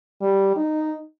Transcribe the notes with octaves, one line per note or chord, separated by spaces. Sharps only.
G3
D#4